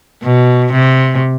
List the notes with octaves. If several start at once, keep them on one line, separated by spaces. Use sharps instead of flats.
B2
C3